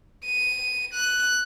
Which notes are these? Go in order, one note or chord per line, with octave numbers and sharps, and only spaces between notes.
D#7
F#6